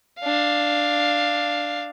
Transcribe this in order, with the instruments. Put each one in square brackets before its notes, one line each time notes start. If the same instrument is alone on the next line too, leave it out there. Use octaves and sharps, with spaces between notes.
[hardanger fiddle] D4 F5